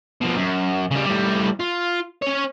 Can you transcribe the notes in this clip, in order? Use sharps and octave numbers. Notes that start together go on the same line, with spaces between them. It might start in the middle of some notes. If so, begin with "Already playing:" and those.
B2 F3
F#2
C#3 G3
A2 G3
F4
C#4 C#5